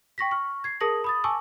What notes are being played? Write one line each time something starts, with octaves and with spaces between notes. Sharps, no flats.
G5 C#6 A#6 B6
C#6 F6
G#6 C7
G#4 A#4 A5 D#6 A#6 F#7
B5 D#6 A6
G#5 A5 C#6 D6 E6